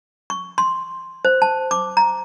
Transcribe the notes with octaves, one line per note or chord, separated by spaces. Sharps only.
C#6
C6
C5
A5
D6
A#5